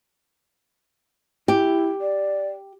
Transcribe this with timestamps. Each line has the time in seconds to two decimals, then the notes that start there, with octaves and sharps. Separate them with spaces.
1.48 E4 G4
2.01 D5